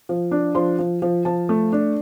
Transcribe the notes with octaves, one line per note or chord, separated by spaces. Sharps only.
F3
D4
F3 C6
F3
F3
F3 A5
A3
D4